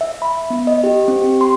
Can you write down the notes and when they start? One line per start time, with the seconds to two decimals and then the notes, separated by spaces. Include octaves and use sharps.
0.01 E5
0.22 B5
0.50 B3
0.67 D#5
0.84 G4
1.08 C4
1.22 G4
1.41 C6